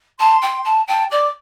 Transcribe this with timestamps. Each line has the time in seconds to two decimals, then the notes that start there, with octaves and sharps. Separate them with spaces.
0.19 A5 C6
0.42 G5
0.65 A5
0.88 G5 A5
1.11 D5 D6